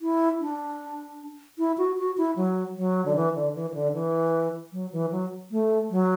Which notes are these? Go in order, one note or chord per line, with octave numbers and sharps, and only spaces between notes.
E4
D4
E4
F#4
F#4
E4
F#3
F#3
D3
E3
D3
E3
E3
D3
E3
F#3
E3
F#3
A3
F#3